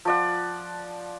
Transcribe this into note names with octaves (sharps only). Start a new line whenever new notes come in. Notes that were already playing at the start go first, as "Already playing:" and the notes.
F3 D5 F#5